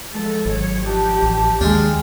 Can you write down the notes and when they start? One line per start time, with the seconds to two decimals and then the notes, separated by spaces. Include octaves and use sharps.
0.13 F3 G#3 A4
0.46 G#1 F#3 C#5
0.86 F3 D4 D#4 G4
1.23 A1 A5
1.61 D#2 G#3 D4 F5 G5